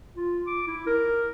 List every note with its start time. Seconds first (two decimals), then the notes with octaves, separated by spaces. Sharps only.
0.16 F4
0.47 D6
0.67 E4
0.87 A#4